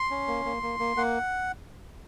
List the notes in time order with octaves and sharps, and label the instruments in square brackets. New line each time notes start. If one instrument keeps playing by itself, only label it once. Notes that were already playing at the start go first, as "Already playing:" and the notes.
Already playing: [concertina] C6
C#4
A#3
A#3
A#3
A#3
A#3 F#5